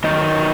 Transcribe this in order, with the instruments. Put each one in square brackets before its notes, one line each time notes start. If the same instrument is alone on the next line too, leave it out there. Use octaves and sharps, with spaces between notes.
[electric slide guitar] D#3 F#3 D#4 D#5